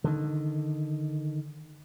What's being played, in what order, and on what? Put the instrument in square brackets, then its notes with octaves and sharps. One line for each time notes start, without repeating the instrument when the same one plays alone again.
[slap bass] D3 D#3